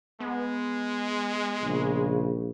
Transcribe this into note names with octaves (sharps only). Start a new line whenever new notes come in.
G#3 B3
A#1 C#3